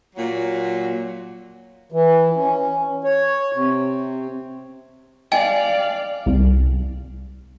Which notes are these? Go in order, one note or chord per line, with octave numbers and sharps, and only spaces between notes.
A#2 F#3
E3
C#4
C#5
C3
D5 D#5 F5 G5 G#5
C2